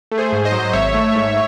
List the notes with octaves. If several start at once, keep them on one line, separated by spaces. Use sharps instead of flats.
A3
G#4 C5
G#2
C5 D#5
F#3
G#1 C#5 E5
A3
G#2